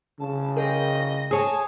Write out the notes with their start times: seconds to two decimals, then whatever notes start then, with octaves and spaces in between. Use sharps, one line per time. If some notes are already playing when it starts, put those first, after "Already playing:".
0.19 C#3 A5
0.56 G#4 A#4 D#5 G5
1.31 G#4 C#5 G#5 A5 D#6